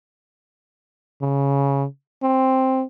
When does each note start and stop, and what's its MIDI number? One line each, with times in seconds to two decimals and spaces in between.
1.22 1.86 49
2.23 2.84 60